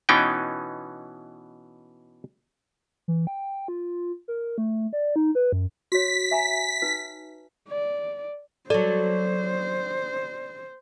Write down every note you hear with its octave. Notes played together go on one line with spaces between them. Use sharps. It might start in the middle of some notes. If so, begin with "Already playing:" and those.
B2 E3 B3 C#4 D#4 G5
E3
G5
F4
A#4
A3
D5
D#4
B4
F#2
F#4 C#5 B6
E5 G#5 A#5
D#4 B4
D5
F#3 A4 C5 D5